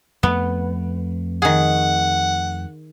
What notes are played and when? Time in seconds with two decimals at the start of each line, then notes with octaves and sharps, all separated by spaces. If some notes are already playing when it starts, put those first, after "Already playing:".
0.23 F2 A3 B3
1.42 D#3 G#4 F#5